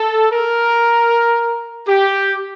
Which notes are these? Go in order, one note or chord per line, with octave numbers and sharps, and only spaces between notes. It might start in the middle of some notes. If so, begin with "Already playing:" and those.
Already playing: A4
A#4
G4